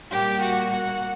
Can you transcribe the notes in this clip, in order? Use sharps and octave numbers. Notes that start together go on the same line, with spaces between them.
A#2 G3 A#3 G4 G5
F#4 F#5
F#4 F#5